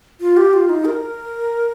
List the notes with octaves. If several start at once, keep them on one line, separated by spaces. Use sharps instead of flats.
F4
G4
F4
D#4
A#4